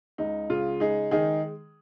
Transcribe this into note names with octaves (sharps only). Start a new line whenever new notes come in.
C#2 D#4
C#3 F4
G#3 D#4 G#4
D#3 D#4 G#4